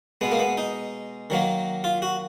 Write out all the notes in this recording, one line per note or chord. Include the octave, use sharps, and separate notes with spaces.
B2 G#3 B3
A#3
B3
D#4
D#3 F#3 A#3
F4
F#4